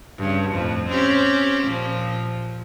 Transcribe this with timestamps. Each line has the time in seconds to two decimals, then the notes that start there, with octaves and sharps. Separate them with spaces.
0.18 G2 C#3
0.51 F2 A2
0.89 C4 C#4 G4
1.64 A#2 F3